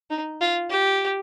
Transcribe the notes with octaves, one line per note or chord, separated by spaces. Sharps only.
D#4
F4
G4